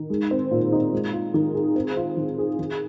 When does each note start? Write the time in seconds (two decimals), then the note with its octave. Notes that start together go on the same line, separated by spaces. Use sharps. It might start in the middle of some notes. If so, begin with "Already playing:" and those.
Already playing: D#3
0.10 G#3
0.31 C4
0.51 A#2
0.72 D#4
0.93 G#3
1.13 F4
1.34 D#3
1.54 G#4
1.76 C4
1.97 F4
2.17 D#3
2.38 G#4
2.59 D#3